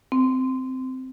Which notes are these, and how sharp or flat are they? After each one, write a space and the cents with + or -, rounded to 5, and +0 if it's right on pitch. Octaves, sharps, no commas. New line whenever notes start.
C4 -10